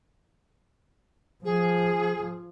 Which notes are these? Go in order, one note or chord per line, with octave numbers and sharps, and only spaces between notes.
F3 G#4